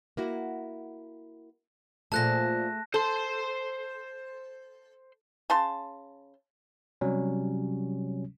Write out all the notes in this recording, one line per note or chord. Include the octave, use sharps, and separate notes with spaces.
A#3 E4 F#4
A#2 F3 A3 G#4 A4 A5 F#6 A#6
A4 C5 C6
C#3 A5 C6
C3 F#3 G3 C#4